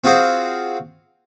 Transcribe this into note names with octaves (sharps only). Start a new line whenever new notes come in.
C4 F4 F#4 G#4 C5